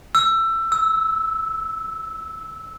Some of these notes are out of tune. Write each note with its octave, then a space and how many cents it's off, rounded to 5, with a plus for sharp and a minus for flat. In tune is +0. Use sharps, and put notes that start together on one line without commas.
E6 +20
E6 -15